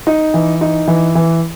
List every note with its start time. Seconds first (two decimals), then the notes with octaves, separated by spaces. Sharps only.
0.07 D#4
0.34 E3
0.61 D#4
0.88 E3
1.15 E3